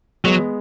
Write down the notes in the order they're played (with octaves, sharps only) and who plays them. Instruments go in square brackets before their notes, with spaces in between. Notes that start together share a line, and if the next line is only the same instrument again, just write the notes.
[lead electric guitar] F#3 [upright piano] G#3 B3